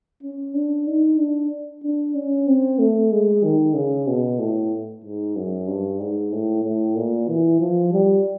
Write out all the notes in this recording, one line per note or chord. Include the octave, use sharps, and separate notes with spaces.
C#4
D4
D#4
D4
D4
C#4
C4
A3
G#3
D#3
C#3
B2
A2
G#2
F#2
G2
G#2
A2
A2
A#2
E3
F3
G3